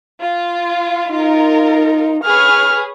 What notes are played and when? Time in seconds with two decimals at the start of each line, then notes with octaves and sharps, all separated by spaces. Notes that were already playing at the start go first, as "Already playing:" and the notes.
0.21 F4
1.12 D#4 F4 A#4
2.23 G#4 B4 C#5 F6